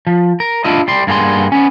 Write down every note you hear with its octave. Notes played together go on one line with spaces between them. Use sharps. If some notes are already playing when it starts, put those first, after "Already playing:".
F3
A#4
D4 E4 F4 D#5
G3 C6
G2 A#3 B3 G#4 C6
B3 C#4